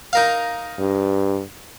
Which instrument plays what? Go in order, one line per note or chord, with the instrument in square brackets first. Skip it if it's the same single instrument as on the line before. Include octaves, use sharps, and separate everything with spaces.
[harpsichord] D#4 A#4 F5
[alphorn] G2